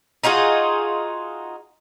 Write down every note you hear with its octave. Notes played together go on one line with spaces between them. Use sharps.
D#4 F4 F#4 G#4